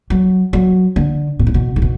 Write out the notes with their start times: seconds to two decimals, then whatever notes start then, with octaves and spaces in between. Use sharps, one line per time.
0.10 F#3
0.53 F#3
0.96 D3
1.39 B2
1.47 A2
1.54 B2
1.76 A2
1.82 B2